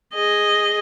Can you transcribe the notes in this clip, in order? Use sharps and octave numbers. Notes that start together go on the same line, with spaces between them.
G#4 D#5